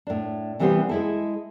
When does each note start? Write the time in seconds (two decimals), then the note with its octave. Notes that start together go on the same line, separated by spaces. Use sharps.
0.07 A2 D4
0.59 C3 E3 G3 B3 G4 C5
0.89 G#3 E4 A4